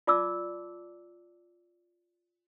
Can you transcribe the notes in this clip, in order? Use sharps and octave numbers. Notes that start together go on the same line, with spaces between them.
F4 D5 A5 D6 E6